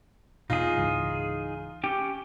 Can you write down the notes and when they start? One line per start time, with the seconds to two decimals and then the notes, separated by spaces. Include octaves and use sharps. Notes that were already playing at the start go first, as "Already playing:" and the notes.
0.50 E2 B2 D#4 F4 G#4
0.77 C#2 G#2 E3
1.83 C#4 G4 G5